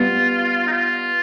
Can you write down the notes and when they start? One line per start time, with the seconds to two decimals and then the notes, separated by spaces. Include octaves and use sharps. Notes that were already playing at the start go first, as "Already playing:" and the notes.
Already playing: G3 B3 F4
0.67 D#4
0.72 F4